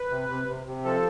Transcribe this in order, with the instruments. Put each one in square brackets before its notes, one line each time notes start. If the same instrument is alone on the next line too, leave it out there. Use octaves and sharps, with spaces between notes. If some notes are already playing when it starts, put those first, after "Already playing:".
Already playing: [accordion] B4
C3
C3
C3
C3
F3 A4